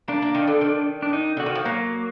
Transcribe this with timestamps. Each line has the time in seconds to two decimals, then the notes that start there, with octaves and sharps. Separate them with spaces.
0.08 A#3 D4
0.22 A#3
0.35 D#3
0.47 D3
0.61 D#3
1.02 D4
1.13 D#4
1.37 D3 F#4
1.46 D#3
1.55 F3
1.65 F#3 A#3